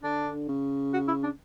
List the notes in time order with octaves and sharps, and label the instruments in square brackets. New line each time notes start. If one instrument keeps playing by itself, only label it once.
[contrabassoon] D3 [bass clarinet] D4
[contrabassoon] C#3
[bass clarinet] F#4
E4
D4